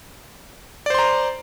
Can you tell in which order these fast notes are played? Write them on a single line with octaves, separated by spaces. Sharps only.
D5 C5 C6 A#5